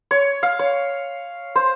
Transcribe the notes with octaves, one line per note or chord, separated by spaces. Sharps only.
C#5
F5
C#5
C5